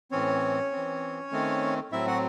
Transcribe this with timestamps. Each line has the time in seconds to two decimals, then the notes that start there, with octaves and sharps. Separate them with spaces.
0.11 A2 E3 C4 C#4 C#5
0.71 C4
0.77 E3
1.32 D#3 A3 C4
1.92 A2 F#3 C4 E4 E5
2.07 F#4 F#5